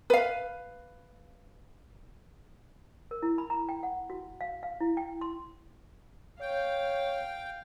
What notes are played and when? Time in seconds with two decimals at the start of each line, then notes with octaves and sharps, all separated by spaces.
0.10 B4 F5
3.11 A#4
3.22 E4
3.38 B5
3.50 A#5
3.69 G5
3.83 F#5
4.10 F#4
4.41 F5
4.63 F5
4.81 E4
4.97 G5
5.21 C6
6.41 C#5 F5 G5